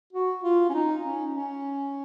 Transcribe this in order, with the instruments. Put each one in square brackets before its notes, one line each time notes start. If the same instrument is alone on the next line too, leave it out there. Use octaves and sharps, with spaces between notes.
[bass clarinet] F#4
F4
C#4
D#4
C#4
C#4